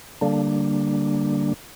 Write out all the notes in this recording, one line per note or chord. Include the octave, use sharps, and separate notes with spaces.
D3 G3 A#3 D4